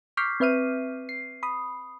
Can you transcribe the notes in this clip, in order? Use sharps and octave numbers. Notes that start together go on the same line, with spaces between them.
C#6 D6 F6 G6 B6 C7
C4 B4 E5 F6 D#7
C7
B5 D#6